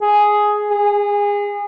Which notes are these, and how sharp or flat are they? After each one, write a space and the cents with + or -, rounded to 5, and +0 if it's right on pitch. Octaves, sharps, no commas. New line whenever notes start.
G#4 +5
G#4 -25